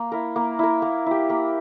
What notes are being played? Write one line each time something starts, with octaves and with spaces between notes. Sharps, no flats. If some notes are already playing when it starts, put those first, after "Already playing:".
Already playing: A#3
E4 A#4
A#3
E4 A#4
A#3
E4 G4
A#3